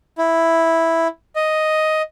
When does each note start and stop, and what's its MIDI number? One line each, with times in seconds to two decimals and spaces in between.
0.18 1.08 64
1.36 2.02 75